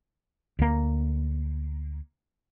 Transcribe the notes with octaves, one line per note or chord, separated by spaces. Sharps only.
D2 A#3